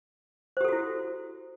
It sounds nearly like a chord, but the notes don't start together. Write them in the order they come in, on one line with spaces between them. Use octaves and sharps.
C5 G4 A4 F#4 E4